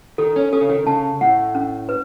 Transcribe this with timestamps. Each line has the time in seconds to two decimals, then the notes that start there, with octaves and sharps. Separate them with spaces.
0.18 D#3 A4
0.36 C#4
0.53 C#4 A4
0.61 C#3
0.69 D#3
0.87 C#3 A5
1.21 A2 F#5
1.55 C#4
1.89 B4